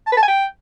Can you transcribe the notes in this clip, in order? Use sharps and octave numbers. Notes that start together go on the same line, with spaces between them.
A5
B4
A5
G#5
G5